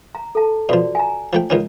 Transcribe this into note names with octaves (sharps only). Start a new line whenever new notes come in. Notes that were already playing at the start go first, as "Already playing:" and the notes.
A#5
A4 A5
B2 F3 F#4 D5
G#5 A#5
F3 A3 G5
C#2 D#3 C#4